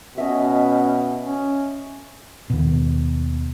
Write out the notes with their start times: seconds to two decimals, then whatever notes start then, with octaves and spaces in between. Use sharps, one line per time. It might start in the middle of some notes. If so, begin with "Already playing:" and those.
0.18 B2 C#4 D#5 E5
1.25 C#4
2.50 D#2 B2